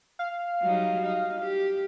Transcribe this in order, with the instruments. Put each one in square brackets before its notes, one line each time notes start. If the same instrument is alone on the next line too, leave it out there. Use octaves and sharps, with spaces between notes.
[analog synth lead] F5
[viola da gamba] F#3 G3 D#4
D#4
G4